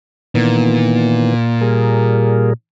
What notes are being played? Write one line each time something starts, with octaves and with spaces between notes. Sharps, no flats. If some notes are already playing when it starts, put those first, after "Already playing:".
A#2 D#3 E3 B3
G3 G#4 A#4